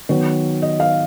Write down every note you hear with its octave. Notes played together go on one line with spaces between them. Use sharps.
D#3 F#3 B3 C#5
D#5
F5